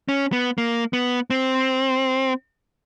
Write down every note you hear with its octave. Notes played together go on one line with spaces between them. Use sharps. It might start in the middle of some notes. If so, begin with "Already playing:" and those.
C#4
B3
A#3
B3
C4